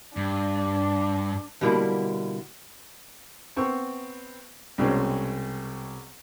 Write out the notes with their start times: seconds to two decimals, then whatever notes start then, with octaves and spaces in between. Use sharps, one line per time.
0.17 G2 D4
1.61 B2 D3 G3 A#3 E4
3.56 B3 C4 C#6 E6
4.78 C2 B2 G#3 C4 C#4